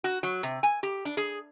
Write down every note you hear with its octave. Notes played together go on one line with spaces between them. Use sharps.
F#4
F#3
C3
G#5
G4
D4
G#4